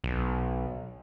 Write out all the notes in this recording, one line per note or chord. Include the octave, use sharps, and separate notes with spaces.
B1